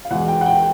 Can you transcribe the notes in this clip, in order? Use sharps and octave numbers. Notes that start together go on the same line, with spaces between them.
F5
E2 B2 G#3 F#5
G5
F#5
G5